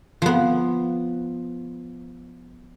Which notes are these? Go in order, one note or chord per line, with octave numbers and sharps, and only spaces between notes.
F3 B3